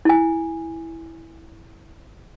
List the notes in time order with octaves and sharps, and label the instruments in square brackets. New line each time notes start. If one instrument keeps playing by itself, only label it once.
[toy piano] E4 G#5